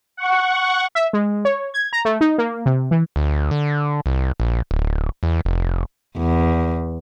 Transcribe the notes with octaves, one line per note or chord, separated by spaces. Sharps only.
F#5 C#6
E5
G#3
C#5
G#6
A#5
A3
D#4
A#3
C3
E3
D2
D3
C2
A#1
D1
E2
F1
E2